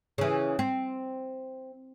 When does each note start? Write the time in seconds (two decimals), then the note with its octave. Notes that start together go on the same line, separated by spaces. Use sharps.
0.18 C#3 E3
0.59 C4